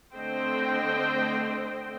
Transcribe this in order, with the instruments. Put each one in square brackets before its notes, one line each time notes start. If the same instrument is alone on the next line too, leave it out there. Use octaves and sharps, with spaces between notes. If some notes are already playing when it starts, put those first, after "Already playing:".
[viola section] D3 A3 C4 C5 D#5 G5